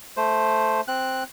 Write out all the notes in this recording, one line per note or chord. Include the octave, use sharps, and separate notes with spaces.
A3 C5
C4 F#6